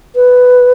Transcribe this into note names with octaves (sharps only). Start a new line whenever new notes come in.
B4